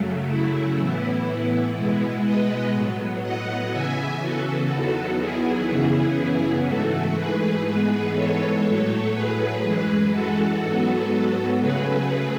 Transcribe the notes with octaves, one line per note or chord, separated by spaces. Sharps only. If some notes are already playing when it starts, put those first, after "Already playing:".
Already playing: F#2 C#3 F#3 A3
E4
A2 E3 B3
B2 G#3 B3 E4
B4 D#5
A2 F#3 B3
D#5 F#5
C#3 E3 B3 E5 G#5
F#4 A4
E2 D#3 F#3 B3
E4 G#4
F#2 C#3 E3 B3
G#2 E3 A3 F#4 A4
G#4 B4
G#2 E3 G#3 B3 G#4 B4
A4 C#5
A2 F#3 A3 A4 C#5
G#4 B4
F#2 E3 G#3
F#4 A4
G#2 F#3 B3
C#3 F#3 A3 G#4 B4